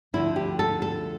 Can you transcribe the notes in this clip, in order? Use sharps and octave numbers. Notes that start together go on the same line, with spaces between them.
D2 D3 F3 E4
G4
A4
A4